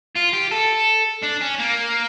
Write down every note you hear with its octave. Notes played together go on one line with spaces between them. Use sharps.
F4
G4
A4
D4
C#4
A#3